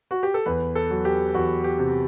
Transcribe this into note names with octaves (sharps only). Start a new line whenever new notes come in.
F#4
G4
A4
E2 B4
A4
F#3
G4
E2 F#4
G4
C3